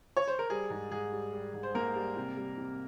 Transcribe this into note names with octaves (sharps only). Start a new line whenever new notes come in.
C#5
C5
A#4
G3 G#4
G#2
G#2 G#4
G3
G3
G#2
C5
G#2 A#3 A#4
G3
C3
G3
C3